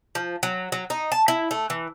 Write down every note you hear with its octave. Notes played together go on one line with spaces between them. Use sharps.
F3
F#3
F#3
D#4
A5
E4
A3
E3